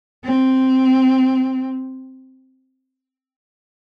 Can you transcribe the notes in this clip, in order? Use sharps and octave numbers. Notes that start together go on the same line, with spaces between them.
C4